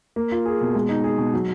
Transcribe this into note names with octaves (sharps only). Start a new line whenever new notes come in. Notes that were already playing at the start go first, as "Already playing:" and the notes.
A#3
F4
G#4
B2
G#3
D#4
G#4
B2
F#3